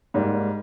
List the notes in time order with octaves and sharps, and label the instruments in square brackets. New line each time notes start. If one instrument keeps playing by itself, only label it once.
[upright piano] G#2 G3 A#3